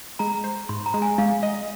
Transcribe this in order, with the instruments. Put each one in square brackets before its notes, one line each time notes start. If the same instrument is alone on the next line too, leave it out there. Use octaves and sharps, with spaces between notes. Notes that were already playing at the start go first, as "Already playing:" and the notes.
[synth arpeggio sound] G#3 [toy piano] A#5
[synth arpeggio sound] C5
[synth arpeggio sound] G#2 [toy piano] C6
[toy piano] A#5
[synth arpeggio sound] G#3
[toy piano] G#5
[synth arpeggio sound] G#3 [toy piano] F5
[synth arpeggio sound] D#5